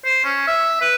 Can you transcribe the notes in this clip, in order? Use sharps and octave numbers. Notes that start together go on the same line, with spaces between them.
C5
C#4
E5
B4